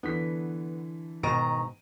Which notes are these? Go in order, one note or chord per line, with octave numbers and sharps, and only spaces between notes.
D3 E3 B3 B6
G#2 B2 D#3 A#5 D7 D#7